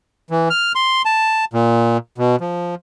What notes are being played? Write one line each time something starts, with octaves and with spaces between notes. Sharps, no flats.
E3
F6
C6
A5
A#2
B2
F3